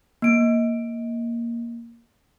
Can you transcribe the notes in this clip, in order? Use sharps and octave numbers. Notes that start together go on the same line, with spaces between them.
A#3 D7